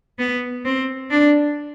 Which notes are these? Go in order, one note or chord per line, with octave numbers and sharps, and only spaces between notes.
B3
C4
D4